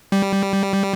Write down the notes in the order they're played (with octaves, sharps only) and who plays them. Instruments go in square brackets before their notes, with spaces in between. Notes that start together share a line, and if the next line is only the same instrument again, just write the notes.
[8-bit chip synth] G3